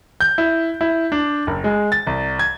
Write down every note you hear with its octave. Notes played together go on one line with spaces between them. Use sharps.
G6
E4
E4
D4
F#1
G#3
A6
C2
G#6